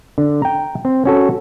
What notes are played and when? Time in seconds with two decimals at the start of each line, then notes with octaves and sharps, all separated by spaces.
0.18 D3
0.42 G5 A#5
0.85 C4
1.05 C#4 F#4 A4